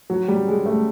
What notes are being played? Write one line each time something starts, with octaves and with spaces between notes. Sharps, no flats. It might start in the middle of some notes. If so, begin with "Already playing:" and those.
F#3
G3
G#3
A3